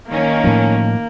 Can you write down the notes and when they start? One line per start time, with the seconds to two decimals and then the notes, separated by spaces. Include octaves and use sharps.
0.10 D#3 A#3 C#4
0.44 A2 F3